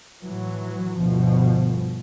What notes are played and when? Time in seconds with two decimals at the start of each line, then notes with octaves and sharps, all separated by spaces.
0.23 A2 E3 F#3
0.99 G1 D2 B2 F3